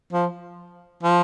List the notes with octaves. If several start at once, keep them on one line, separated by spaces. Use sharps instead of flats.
F3
F3